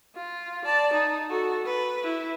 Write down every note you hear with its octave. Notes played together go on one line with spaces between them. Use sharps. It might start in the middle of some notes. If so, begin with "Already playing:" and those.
F4
D5 A5
D#4
F#4 A4
B4
E4